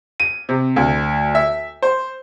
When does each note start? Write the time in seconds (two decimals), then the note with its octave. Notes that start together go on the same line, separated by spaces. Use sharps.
0.20 D#7
0.49 C3
0.76 D2
1.35 E5
1.82 C5